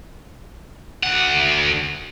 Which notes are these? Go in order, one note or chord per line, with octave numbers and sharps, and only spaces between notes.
D2 F#5